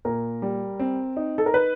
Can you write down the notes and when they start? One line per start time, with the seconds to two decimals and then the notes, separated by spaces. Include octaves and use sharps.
0.05 A#2 A#4
0.42 G3
0.79 C4
1.17 D#4
1.38 A4
1.46 A#4
1.54 B4